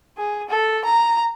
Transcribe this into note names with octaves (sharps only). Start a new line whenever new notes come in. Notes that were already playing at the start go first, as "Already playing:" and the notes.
G#4
A4
A#5